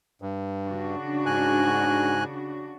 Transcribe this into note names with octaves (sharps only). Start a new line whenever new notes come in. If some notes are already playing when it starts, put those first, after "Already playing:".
G2
C#3 D4 F#4
G#2 G#5 F#6